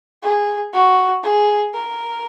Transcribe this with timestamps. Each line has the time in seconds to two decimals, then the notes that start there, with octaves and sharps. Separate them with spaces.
0.23 G#4
0.73 F#4
1.23 G#4
1.74 A#4